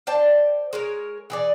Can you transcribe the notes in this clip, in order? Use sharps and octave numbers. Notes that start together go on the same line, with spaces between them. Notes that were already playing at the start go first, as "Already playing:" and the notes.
C5 D5 G5 A5
G#3 A#4 C#5
E3 G#4 D5